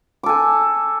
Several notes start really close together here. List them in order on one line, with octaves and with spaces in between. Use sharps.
D6 A4 G#5